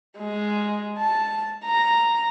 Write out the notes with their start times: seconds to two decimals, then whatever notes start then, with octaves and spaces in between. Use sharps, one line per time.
0.19 G#3
0.98 A5
1.65 A#5